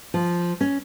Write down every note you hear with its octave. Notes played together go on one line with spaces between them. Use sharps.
F3
C#4